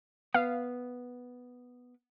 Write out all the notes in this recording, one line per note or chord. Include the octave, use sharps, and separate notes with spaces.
B3 F5